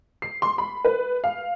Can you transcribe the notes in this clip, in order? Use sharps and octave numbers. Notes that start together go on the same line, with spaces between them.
C7
C6
B5
B4
F5